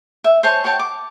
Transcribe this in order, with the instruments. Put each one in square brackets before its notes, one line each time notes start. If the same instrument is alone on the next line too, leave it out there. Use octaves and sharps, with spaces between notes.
[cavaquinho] E5
C5 C#5 G#5 A5
F#4 C#5 G5 A5
D6